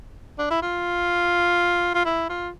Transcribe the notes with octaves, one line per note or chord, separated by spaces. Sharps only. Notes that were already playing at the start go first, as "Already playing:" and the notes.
D4
E4
F4
F4
E4
F4